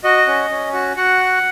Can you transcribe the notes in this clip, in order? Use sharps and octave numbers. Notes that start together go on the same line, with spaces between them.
F#4 D#5
C#4
C#4
F#4
F#4 F#5